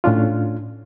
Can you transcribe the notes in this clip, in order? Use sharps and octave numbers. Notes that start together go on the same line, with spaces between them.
A2 C#4 D4 F4